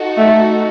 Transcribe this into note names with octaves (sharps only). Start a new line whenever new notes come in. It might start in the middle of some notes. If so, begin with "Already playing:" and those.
Already playing: D#4 F#4 A4
A3